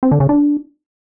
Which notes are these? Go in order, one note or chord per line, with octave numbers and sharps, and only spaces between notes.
C4
D3
C#3
D4